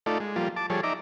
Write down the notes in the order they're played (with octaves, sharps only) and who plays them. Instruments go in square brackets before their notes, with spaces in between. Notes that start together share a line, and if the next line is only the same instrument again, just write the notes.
[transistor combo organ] A3 D#4 F4 A4 D5
G#3
F3 G3 A#3 F4
A5 D6
F3 G3 G#4 A4 C#5
D#4 D5 E5 A#5 D6